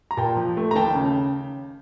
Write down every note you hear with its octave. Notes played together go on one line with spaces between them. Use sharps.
A#5
A#2 G5 A5
F3
A3
A#5
D#2 G5 A5
C#3